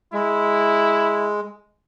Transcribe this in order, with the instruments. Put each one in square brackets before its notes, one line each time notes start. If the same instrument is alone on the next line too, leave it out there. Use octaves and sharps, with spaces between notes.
[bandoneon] G#3 [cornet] E4